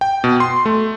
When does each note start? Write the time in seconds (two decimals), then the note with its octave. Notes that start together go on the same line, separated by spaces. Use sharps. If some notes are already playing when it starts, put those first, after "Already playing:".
0.01 G5
0.24 B2
0.40 C6
0.66 A3